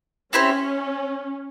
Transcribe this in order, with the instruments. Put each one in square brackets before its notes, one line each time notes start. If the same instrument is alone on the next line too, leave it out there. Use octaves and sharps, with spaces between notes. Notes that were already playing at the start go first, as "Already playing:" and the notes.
[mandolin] C4 E4 G4 C5 [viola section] C#4